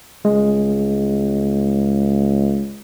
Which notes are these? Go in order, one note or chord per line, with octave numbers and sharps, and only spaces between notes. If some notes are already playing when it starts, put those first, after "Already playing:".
C#2 G#3